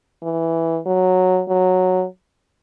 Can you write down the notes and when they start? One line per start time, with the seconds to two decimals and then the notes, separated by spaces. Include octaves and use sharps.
0.23 E3
0.86 F#3
1.48 F#3